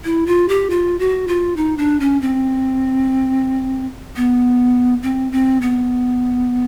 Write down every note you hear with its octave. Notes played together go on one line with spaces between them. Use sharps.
E4
F4
G4
F4
F#4
F4
D#4
D4
C#4
C4
B3
C4
C4
B3